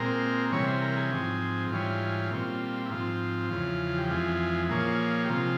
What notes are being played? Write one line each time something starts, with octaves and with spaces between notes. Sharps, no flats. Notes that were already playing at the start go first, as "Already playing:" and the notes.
Already playing: A#2 G#3 C4 A#4
C3 E3 G3 C#4 C#5
C5
A#4
G#4
G#2 F3 C4
G#2 E3 G3 C#4 F4
A#2 G3 C4
E4
G#2 F3 C4 F4
E2 C#3 F3
G4
F2 E3 G#3 F4
A#2 F3 A#3 C#4 G#4
G4
C3 F3 G#3 F4